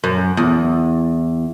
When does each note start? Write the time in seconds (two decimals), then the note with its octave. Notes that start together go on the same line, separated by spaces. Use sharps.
0.04 F#2
0.37 E2